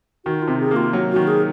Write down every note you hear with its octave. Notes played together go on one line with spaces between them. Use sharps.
D#3 F#4
F4
C3
G#4
A#3
F4
F#3
D#3 F#4
G#4